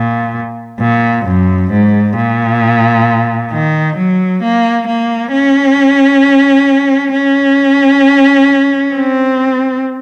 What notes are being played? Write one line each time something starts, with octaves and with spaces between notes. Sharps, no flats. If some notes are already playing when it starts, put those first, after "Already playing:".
Already playing: A#2
A#2
F#2
G#2
A#2
D#3
F#3
A#3
A#3
C#4
C#4
C4